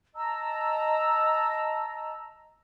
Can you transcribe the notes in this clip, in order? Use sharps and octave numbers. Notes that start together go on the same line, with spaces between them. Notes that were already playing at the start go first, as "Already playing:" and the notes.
D#5 A5 A#5 E6